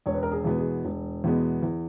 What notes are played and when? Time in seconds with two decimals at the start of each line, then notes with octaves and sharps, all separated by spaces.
0.06 E1 C#5
0.14 B4
0.23 A#4
0.31 G#4
0.44 E2 B2 G#3 B3
0.58 G#4
0.85 E1
1.24 E2 B2 G#3 B3
1.62 E2